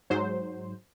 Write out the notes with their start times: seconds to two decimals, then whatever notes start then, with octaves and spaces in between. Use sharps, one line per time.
0.10 G#2 F#3 C5